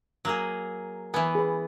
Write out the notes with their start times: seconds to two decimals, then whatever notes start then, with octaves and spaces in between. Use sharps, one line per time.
0.25 F#3 A#3 G#4
1.14 E3 B3 G#5
1.35 G#4 B4